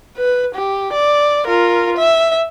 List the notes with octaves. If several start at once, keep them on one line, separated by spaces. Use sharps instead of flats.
B4
G4
D5
F4 A#4
E5